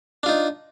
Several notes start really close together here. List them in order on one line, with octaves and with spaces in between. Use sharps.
D4 F4 D#4